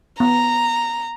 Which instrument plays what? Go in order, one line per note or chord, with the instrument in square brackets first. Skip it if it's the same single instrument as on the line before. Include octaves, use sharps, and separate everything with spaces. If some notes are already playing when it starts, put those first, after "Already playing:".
[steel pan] B3 [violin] A#5